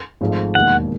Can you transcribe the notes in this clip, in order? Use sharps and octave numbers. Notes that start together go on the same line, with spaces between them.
G#1 G#2 F3 A3
E1 D#2 D#3 F#5